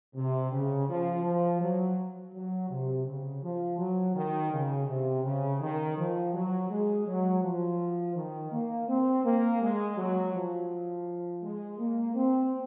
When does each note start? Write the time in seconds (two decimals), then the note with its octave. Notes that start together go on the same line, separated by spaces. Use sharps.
0.16 C3
0.51 C#3
0.88 F3
1.24 F3
1.60 F#3
2.34 F#3
2.70 C3
3.06 C#3
3.43 F3
3.78 F#3
4.15 D#3
4.52 C#3
4.87 C3
5.24 C#3
5.61 D#3
5.97 F3
6.34 F#3
6.70 G#3
7.07 F#3
7.42 F3
8.15 D#3
8.52 A#3
8.89 C4
9.24 A#3
9.61 G#3
9.97 F#3
10.34 F3
11.42 G#3
11.79 A#3
12.15 C4